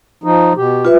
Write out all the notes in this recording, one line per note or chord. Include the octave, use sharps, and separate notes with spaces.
F3 D#4
B2 G4
F4 B4 E5